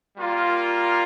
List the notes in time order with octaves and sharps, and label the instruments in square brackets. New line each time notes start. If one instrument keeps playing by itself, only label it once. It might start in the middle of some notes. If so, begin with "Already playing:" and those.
[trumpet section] G3 A#3 F4 A#4